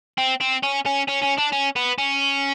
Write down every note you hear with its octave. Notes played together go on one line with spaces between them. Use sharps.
C4
C4
C#4
C#4
C#4
C#4
D4
C#4
B3
C#4